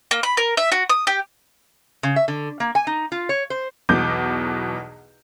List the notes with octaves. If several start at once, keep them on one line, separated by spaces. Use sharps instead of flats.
A#3
B5
A#4
E5
F#4
D#6
G4
C#3
E5
D3
A#3
G#5
D#4
F4
C#5
C5
B1 E2 B2 D6 G6